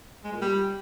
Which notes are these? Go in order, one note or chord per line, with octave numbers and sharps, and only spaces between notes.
G#3
A#2
G3